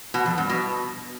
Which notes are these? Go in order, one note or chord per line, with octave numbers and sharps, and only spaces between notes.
B2
F2
G2
B2